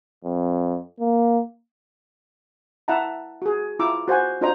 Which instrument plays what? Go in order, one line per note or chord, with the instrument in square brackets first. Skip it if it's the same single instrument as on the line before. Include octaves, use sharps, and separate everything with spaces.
[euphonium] F2
A#3
[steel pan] E4 E5 F#5 A5 A#5
F#4 G#4
E4 F4 A#5 D6 E6
F#4 C5 F#5 G#5
D4 F4 F#4 C5 D#5 A#5